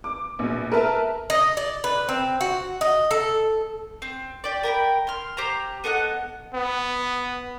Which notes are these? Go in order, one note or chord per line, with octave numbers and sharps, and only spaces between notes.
D6
A#1 B2
A#4 B4 E5 A5
D#5
D5
B4
C4
F#4
D#5
A4
C4
G4 D5
A#4 G5 A5 B5
C6 F6
G4 C5 A#5
B3 A4 D#5 F#5
B3